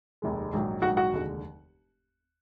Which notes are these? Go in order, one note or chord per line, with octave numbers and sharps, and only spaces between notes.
F1 D#2 D#3 G#3
A#1 G#2 D#3 F#3
A#1 G#2 D#3 F#3 F#4 F#5
F#4 F#5
F1 D#2 D3 G#3